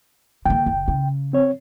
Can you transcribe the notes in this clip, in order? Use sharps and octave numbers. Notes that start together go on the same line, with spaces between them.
D3 A#3 G5
F#1
C#3
C4 C#5